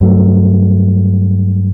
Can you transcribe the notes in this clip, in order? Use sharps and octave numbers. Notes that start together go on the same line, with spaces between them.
G2 F#3 A3